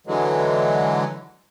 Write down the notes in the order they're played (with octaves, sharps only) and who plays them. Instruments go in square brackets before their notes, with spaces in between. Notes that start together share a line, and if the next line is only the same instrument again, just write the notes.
[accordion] D3 E3 F#3 G#3